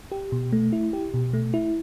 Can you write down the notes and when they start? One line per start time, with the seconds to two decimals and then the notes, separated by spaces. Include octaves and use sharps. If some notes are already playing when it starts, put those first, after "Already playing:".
0.12 G4
0.32 B2
0.53 A3
0.72 E4
0.93 G4
1.14 B2
1.33 A3
1.54 E4